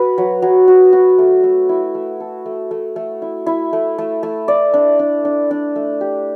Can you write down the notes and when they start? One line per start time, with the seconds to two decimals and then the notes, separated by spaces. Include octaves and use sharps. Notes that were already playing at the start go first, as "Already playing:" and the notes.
Already playing: F#4 B4
0.18 F#3
0.42 F#3
0.68 F#4
0.93 F#4
1.18 A3
1.44 A3
1.69 E4
1.95 A3
2.20 A4
2.46 A3
2.71 A3
2.96 A3
3.22 E4
3.47 E4
3.73 A3
3.98 A3
4.23 A3
4.48 D5
4.74 D4
4.99 D4
5.25 D4
5.51 D4
5.76 A3
6.01 G4